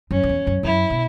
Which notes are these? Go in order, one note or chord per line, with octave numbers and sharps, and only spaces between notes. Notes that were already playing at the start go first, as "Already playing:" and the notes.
F#2 C#4
F#2
E2
F#2
F#2 E4
B2